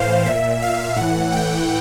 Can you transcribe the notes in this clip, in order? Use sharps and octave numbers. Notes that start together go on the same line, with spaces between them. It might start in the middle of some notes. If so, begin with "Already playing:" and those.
Already playing: A2 E3 C5 F5
A#2 E5
F5
A2 E3 F#5
G5